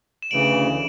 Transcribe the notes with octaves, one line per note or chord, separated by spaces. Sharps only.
E7
D2 C#3 E3 D7 F#7